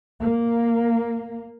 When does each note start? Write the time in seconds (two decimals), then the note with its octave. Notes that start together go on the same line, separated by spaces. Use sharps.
0.21 A#3